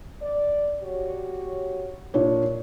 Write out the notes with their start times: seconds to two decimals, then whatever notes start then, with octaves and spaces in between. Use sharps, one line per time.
0.22 D5
0.83 F#4 G4 C#5
2.14 A#2 D4 C#5